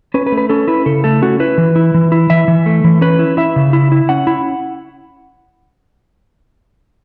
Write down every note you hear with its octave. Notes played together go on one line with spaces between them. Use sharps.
C#4 B4
B4
A3
B4
C#4 A4
E4 B4
C#3 A4
A3 A4
C#4 F#4
E4 B4
E3
E4
E3
E4
E3 E5
E3
A3
E3
C#4 B4
E4
E4 E5
C#3
E4
E4
C#4 F#5
E4